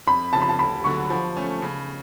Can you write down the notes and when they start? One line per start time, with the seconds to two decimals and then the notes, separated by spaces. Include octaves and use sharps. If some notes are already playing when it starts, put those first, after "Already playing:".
0.07 F2 B5
0.33 C#3 F3 A5
0.42 B5
0.49 A5
0.59 D2 B5
0.84 D3 F#3 C#6
1.10 F3
1.37 A3 C#4
1.62 C#3